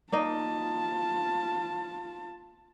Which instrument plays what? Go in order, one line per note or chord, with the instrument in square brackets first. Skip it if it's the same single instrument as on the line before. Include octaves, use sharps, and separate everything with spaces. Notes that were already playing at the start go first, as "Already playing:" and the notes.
[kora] A#3 D#4 D#5 [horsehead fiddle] F4 A5